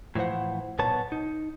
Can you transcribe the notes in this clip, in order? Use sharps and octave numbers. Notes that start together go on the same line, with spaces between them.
A2 E3 F3 C5 F#5
B1 A#2 B3 C#5 A5
D#4